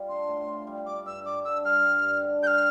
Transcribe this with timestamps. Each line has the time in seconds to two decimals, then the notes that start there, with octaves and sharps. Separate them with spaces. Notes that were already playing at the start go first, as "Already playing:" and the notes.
Already playing: G3 F4
0.09 D4 C6
0.28 A2
0.47 F4
0.67 G3
0.86 G3 D6
1.06 G2 E6
1.25 G2 D6
1.45 D3 E6
1.65 G3 F6
1.85 G2
2.03 G2
2.23 D3
2.42 G3 G6
2.47 F6